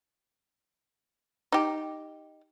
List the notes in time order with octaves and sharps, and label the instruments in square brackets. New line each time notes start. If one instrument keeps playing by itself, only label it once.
[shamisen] D#4 G4